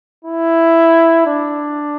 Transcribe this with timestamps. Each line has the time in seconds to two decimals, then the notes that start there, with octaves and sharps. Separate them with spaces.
0.25 E4
1.26 D4